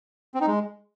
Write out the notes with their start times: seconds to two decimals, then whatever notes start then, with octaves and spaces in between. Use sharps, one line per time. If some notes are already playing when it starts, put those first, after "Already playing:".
0.34 C4
0.41 D#4
0.47 G#3